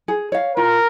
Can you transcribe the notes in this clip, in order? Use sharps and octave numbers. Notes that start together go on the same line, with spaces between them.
G#4
C#5 F5
F4 A#4